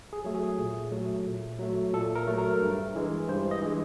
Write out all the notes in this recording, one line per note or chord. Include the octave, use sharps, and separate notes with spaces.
G#4
F#3 A3
G#4
A#2
F#3 A3
A#2
F#3 A3
A#2 A4
A#4
F#3 A3
A#4
G2
E3 G#3
G2 C5
D#5
E3 G#3